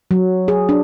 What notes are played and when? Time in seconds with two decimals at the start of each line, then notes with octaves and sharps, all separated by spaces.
0.11 F#3
0.48 G#4
0.69 D4